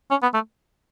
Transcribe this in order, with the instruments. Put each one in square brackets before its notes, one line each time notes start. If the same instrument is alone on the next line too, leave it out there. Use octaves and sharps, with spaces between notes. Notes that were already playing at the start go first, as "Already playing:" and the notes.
[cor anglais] C#4
B3
A3